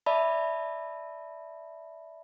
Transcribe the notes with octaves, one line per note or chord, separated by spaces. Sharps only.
D5 E5 A5 B5